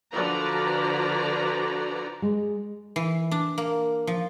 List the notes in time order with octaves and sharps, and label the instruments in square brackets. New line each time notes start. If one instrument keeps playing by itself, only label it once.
[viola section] D3 F3 F#4 B4 D5 A#5
[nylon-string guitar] G#3
[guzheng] E3
D4
A#3
F3